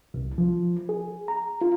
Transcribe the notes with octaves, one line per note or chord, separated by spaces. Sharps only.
C2
F3
G#4
A#5
F4